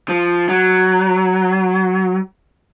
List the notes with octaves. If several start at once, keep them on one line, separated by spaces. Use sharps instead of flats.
F3
F#3